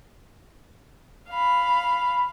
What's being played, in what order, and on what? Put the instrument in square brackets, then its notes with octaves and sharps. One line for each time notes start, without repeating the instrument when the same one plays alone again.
[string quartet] F5 B5